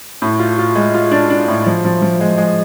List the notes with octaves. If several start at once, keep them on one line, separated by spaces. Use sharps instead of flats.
A2
F4
F4
G#3
F4
D4
D4
A2
F3
F3
F3
G#3
G#3